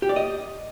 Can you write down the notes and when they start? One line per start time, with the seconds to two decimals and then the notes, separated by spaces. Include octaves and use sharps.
0.02 G4
0.09 D5
0.16 D#5